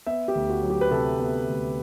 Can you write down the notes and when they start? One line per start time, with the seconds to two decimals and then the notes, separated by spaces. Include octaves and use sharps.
0.07 B3 E5
0.28 G4
0.35 D2
0.50 F#4
0.63 F#3
0.70 G4
0.81 B4
0.91 C3 A4
1.20 B3
1.48 D2